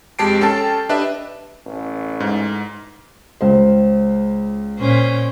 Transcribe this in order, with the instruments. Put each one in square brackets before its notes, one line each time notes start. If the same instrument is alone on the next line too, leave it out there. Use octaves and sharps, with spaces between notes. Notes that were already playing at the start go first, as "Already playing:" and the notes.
[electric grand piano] F2 G#3 G4 A5 C7 D7
C#4 A4 G5 A5
D4 G4 B4 D#5 E5
[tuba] A1
[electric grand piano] G#2
[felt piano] C#2 C5
[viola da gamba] A#2 C#4 C5